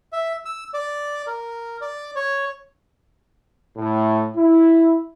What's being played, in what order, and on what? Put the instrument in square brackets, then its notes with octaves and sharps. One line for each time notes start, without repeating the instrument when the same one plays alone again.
[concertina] E5
E6
D5
A#4
D5
C#5
[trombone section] A2
E4